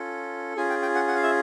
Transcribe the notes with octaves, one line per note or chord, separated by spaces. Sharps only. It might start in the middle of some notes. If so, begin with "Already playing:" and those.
Already playing: C#4 F4 A4
C#4 F4 G#4 G#5
G5
G5
F#5
F#5
F5
E5